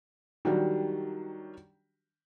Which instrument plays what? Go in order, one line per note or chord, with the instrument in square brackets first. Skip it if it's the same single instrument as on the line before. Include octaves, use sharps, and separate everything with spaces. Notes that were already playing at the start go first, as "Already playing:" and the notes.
[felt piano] D#3 F#3 G3 D4 F#4 G4